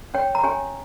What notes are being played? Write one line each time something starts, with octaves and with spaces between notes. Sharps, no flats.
C#4 G4 C#5 G5
A#5
C#4 G4 C#5 G#5